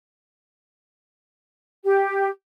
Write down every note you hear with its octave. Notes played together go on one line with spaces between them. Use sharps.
G4